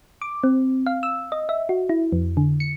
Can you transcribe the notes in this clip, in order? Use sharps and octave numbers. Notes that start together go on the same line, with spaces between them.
D6
C4
F5
E6
D#5
E5
F#4
E4
F2
D3
C#7